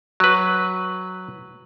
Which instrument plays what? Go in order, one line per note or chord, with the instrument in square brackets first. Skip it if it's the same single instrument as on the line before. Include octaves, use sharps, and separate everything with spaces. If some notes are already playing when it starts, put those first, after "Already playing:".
[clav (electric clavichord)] F#3 B4